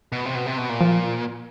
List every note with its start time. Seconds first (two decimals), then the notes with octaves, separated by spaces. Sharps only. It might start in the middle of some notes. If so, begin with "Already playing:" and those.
0.12 B2
0.25 C3
0.35 B2
0.46 C3
0.58 B2
0.69 A#2
0.81 F3